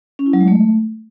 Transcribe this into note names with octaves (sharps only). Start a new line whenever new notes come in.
C#4
E4
F#3
G#3
A3